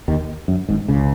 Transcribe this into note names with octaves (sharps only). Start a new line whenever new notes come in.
D#2 D#3
F#2
G#1 G#2
C#2 C#3